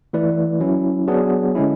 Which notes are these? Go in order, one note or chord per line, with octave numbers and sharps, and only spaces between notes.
E3 A3 E4 B4 D5
F#3 C#4 E4
F#3 B3 D4 G#4
D3 G#3 C#4 E4